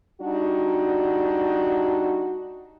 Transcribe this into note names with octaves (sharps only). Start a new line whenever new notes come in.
G3 D4 D#4 F#4